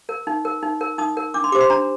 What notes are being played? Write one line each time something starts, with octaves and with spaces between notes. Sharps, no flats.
A#4
D#4
A#4
D#4
A#4
D#4 D#6
A#4
D4 D6
C6
G4 C5 D6
C6
D4 A#5